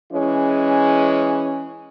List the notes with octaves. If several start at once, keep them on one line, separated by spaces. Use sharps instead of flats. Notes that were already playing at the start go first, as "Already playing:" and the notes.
E3 G#3 C#4